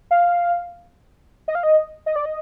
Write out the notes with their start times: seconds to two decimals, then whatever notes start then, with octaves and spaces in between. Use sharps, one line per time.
0.11 F5
1.48 D#5
1.55 F5
1.63 D#5
2.06 D#5
2.16 D5
2.25 D#5